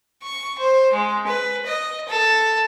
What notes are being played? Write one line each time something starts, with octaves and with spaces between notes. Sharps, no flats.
C#6
C5
G#3
B4
D#5
A4